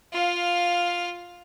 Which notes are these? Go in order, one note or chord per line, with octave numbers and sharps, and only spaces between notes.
F4 F5